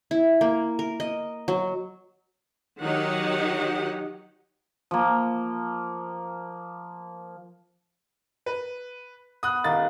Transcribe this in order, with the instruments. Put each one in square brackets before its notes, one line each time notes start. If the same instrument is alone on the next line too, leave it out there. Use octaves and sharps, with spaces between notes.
[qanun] E4
A#3
A#4
D#5
F#3
[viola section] D#3 F#3 D#4 G4 F#5
[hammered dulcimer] F3 A#3
[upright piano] B4
[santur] B3 [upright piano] D#6 F#6
[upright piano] D#1 A6 [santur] A#3 D#4